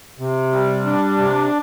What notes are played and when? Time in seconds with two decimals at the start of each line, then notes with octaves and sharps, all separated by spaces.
0.19 C3
0.52 G3
0.85 D4
1.18 C3